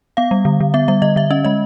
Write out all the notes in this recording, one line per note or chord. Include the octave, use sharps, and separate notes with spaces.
B3 F5
G3
D3
D3
B3 E5
G3 E5
D3 D#5
D3 E5
C#4 D#5
G#3 D#5